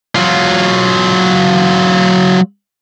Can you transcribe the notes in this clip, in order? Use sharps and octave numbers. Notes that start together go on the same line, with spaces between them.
F#3 F4